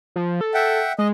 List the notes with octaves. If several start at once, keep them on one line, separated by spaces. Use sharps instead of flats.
F3
A4
E5 F#5 G5
G#3 D#5